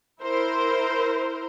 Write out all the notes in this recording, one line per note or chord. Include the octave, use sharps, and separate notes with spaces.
E4 A#4 C5